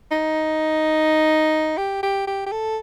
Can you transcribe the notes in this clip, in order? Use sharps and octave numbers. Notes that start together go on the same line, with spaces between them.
D#4
G4
G4
G4
G4
A4